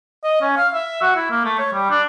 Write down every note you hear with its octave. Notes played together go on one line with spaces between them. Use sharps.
D#5
C#4
F5
E5
F#4
E4
A#3
A3
C#5
G3
D4